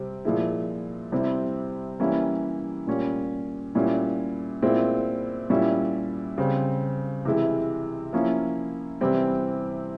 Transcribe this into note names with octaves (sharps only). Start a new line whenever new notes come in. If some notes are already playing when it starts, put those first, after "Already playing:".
Already playing: C3 G3 C4
A#2 F3 G#3 E4
C3 G3 C4 E4
E3 G3 A#3 C#4 E4
A#2 G3 C#4
A#2 G3 C#4 E4
A#2 G#3 C4 E4
A#2 G3 C#4 E4
C#3 G3 C4
C3 E3 G#3 E4
F3 A#3 C#4 E4
C3 E3 G3 C4 E4